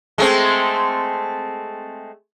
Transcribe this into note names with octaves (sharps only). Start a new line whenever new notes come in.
G#3 A3 C4